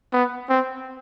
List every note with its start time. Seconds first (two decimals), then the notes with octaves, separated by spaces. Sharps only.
0.13 B3
0.49 C4